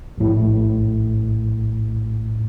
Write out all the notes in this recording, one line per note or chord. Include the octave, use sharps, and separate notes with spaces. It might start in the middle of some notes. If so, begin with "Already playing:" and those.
A#1 A2